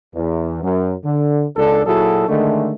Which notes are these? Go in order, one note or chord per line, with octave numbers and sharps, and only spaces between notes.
E2
F#2
D3
C#2 D4 A4
A#2 F#3 E4 F#4 G#4 A4
D3 D#3 G#3 A3